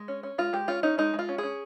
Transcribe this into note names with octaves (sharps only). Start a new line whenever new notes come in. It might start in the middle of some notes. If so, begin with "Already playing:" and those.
Already playing: G#3
C#4
C#4
G#3 F4
G#3 G4
C#4 F4
C#4 D#4
G#3 D#4
G#3
F4
C#4
G#4
C#4